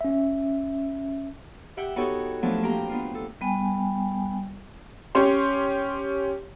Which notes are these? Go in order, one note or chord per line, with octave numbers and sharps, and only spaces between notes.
C#4 E5
G4 E5 F#5 G5
B3 D#4 F#4 G4 A4 C#5
F3 F#3 A3 B3 D4 A5
A#3 C4 G4 G5 A#5
B3 D4 F4
A4
G3 B3 G5 G#5
C#4 G4 C#5 C6